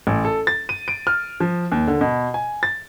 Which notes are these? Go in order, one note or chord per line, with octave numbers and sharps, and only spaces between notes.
A1
A4
A6
D#7
D7
F6
F3
D#2
D3
B2
G#5
A6